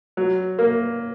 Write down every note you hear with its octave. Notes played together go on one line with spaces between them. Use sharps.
F#3
A#3